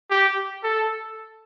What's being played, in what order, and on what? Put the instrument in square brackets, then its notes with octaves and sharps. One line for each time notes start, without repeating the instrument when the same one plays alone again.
[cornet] G4
A4